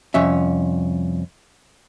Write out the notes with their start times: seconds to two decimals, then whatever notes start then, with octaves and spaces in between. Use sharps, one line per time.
0.14 C2 F2 C#4 E5